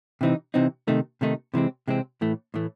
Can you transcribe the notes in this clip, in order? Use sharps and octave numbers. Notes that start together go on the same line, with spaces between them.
C3 E3 C4 D#4
C3 E3 C4 D#4
C3 D#3 A3 D#4
C3 D#3 A3 D#4
C3 E3 G#3 C4
C3 E3 G#3 C4
A2 E3 A3
A2 E3 A3